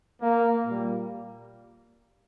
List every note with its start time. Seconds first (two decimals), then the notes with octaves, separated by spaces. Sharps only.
0.22 A#3
0.66 A#2 G3